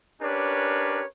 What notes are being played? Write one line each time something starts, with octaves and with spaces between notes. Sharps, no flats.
C#4 D4 G4 A#4 B4 C#5